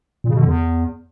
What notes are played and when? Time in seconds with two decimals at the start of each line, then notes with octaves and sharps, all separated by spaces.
0.24 A#2
0.29 C#3
0.34 B2
0.40 D3
0.45 E2